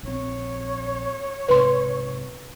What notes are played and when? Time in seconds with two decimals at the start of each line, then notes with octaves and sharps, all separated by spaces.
0.03 A#1 C4 C#5
1.48 B1 G#2 C3 B4 C6